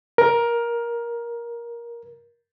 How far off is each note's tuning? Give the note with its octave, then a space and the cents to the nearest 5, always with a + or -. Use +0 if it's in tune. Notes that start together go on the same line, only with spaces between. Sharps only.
A#4 +15